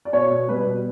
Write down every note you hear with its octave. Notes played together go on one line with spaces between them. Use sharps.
D5
B2 C#5
B2
G3 B4
B2